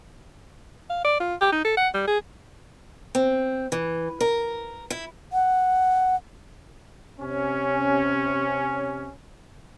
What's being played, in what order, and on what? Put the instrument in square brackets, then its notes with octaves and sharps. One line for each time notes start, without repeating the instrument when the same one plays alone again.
[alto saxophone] F5
D5
F4
G4
D#4
A4
F#5
G3
G#4
[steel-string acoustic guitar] C4
E3
A#4
E4
[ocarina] F#5
[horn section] C3 C#4